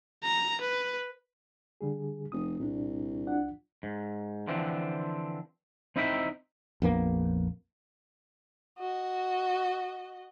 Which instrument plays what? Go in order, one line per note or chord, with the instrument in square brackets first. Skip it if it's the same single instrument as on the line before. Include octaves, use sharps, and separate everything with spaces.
[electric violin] A#5
B4
[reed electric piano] D3 G3 G#4
[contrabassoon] F1 [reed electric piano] D#6
[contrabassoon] C2 [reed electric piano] A#2 D4
[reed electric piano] D4 F4 F#5
[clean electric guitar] G#2
D3 E3 F3 C4
C4 D#4 E4 D#5 E5 G5
[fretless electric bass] A#1 F2 A#3 B3
[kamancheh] F#4 D#5